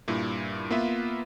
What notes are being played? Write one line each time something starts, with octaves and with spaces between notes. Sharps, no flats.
G2 A#2 E4
A#3 B3 F4 B4 E5